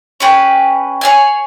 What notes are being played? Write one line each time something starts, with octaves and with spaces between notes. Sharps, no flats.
C#4 G#4 B4 G5
G#4 C#5 G#5